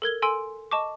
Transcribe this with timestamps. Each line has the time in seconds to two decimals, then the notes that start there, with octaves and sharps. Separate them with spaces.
0.02 A4 A#4 G#6 G7
0.22 A4 G#5 C6 E6 D7
0.71 D#5 A5 C#6 D6